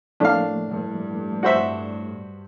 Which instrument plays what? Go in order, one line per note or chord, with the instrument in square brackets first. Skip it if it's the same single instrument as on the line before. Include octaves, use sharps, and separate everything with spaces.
[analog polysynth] A2 [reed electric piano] F3 A3 A#3 [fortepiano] D4 F5
[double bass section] G2
[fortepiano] F#4 C5 E5